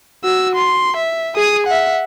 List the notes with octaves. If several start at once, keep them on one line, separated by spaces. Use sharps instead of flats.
F#4 E6
C6
E5
G#4 D#6
E5 F#5